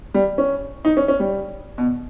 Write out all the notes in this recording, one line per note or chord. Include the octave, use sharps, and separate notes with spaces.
G3
C#4
D#4
C#4
C#4
G3
B2